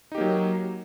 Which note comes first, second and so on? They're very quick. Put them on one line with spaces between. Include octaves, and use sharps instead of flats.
D#4 G4 A#3 F#3